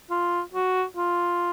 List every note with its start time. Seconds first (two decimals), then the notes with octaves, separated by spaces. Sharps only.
0.11 F4
0.54 F#4
0.97 F4